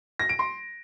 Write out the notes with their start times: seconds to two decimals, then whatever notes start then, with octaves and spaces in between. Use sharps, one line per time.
0.19 A#6
0.29 D7
0.39 C6